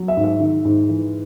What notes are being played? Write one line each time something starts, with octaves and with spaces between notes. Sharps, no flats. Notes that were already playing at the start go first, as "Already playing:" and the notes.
Already playing: F#3
E5
G#2
E5
D#3
G#2
E3